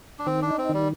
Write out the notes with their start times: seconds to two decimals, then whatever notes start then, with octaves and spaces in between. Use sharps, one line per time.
0.19 D4
0.26 D#3 C4
0.42 D4
0.47 D#4
0.58 C4
0.69 D#3
0.74 G3